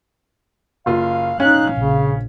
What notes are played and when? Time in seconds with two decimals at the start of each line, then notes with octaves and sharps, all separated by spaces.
0.86 F#1 F4 F5
1.40 C#4 D#4 F5 F#6
1.74 A#1 C#3